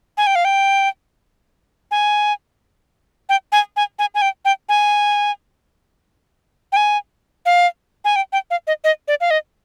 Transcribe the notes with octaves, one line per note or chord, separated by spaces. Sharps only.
G#5
G5
F5
G5
G#5
G5
G#5
G#5
G#5
G#5
G5
G5
G#5
G5
G#5
F5
G#5
G5
G5
F5
D#5
D#5
D5
F5
D#5